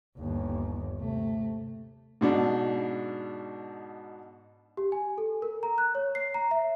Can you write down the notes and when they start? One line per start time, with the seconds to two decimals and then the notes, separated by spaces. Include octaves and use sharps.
0.18 G1 D#2
0.97 C3 A3
2.21 G#2 B2 D4
4.77 G4
4.92 G#5
5.18 A4
5.42 A#4
5.63 A#5
5.78 F#6
5.95 C#5
6.15 C7
6.34 A#5
6.51 E5